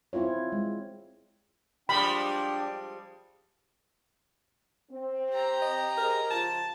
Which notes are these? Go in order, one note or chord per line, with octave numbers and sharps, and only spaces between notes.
C4 E4 F4 C#5
G#3
F3 G3 G#3 D4 G5 B5
C4
G4 A#5
D#5
G#4 A#4 C5 D#5
C#3 F3 F4 A5